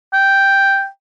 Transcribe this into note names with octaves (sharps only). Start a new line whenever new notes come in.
G5